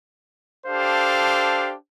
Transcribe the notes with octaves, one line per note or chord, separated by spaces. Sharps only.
D4 G4 A4 C5 F5